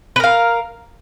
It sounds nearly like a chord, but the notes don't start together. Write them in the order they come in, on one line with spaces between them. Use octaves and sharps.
B4 A#4 F5